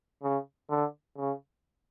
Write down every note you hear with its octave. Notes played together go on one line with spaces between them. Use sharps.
C#3
D3
C#3